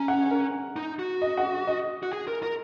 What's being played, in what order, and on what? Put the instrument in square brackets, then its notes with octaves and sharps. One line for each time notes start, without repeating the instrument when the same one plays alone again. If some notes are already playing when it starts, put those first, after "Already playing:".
Already playing: [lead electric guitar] C#4 [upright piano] A#5
[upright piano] F#5
A#4
[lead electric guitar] D#4
F#4
[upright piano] D#5
F#5
D#5
[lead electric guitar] F#4
G#4
A#4
A#4